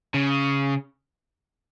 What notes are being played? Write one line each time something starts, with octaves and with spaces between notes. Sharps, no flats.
C#3